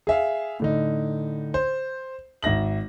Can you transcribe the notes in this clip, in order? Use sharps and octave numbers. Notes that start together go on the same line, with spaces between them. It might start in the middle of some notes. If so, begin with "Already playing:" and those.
G#4 E5 F5
A2 D3 D#4
C5
G#1 E5 A#6 F#7